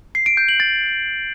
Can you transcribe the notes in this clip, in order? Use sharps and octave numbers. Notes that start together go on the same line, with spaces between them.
C7
D7
G6
F#7
A6